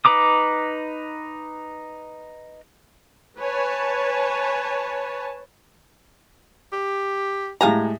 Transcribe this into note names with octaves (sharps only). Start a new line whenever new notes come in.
D#4 B4 A#5 D6 D#6
B4 C#5 G#5 A5
G4
A2 G#3 G4 F5 G#5 A#5